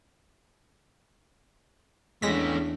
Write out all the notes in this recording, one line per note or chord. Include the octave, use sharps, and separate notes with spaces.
E2 G#3 A3 C#4 D4 A#6 B6